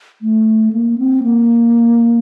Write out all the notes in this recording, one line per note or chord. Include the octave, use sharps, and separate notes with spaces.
A3
A#3
C4
A#3